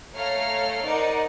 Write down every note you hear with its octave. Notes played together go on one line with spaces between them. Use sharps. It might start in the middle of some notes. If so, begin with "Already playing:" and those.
A3 A4 C#5 F5 A#5 F6
D#4 A#4 C5 D5 F#5